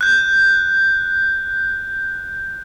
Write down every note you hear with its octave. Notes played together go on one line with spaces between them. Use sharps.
F#6 G6